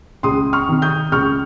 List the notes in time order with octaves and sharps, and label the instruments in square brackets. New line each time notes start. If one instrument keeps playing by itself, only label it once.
[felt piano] C#2 C6 D#6
C#6 F6
C3 D#3
D#6 G6
C#2 C#6 F6